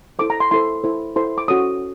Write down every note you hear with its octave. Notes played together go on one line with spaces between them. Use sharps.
E4 A4 C5 D6
A#5
C6
E4 A4 C5 C6
E4 A4 C5
E4 A4 C5 C6
D6
C#4 F#4 A4 C#5 D#6